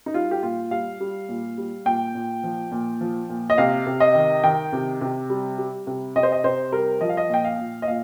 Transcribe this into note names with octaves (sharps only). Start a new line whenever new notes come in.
D#4
G3 F4
G4
A#2 F4
G3 F5
G3
A#2
G3
A#2 G5
A#2
F3
A#2
F3
A#2
D#5
C3 F5
C3
D#5
D#3
D#3 G5
C3
C3
G3
G3
C3
C3 D#5
C5
D#5
C3 C5
G3 A#4
F3 D#5
F5
D#5
A#2 G5
F5
A#2
D#5
A#2 F5